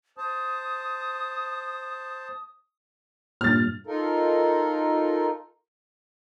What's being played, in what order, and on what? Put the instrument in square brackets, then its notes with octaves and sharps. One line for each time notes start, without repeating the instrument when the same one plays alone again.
[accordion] C5 A5 [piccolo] D#6
[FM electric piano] G2 A#2 [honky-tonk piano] F6 A6
[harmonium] D#4 F4 A4 A#4